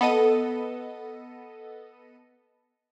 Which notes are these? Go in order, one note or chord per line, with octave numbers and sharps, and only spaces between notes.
B3 A4 D#5 D#7